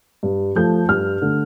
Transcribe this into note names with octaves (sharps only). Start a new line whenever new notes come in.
G2
F3 A3 G6
G2 F6
D3 A3